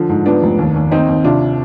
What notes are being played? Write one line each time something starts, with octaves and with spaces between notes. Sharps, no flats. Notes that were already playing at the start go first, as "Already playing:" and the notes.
Already playing: D3 F3
G#2
F3 B3 D4
F1
D#2
D#2
D#2 C4 D#4
D#2
C3 D4 F4